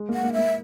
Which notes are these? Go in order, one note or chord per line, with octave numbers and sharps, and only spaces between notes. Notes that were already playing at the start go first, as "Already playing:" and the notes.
Already playing: G#3
A#3 F#5
A#3
E5
A#3